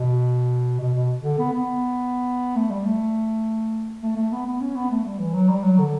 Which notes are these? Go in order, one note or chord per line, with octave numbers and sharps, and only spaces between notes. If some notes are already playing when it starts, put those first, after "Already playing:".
Already playing: B2
B2
B2
D3
B3
B3
A3
G3
A3
A3
A3
B3
B3
C#4
B3
A3
G3
E3
F#3
G3
F#3
D3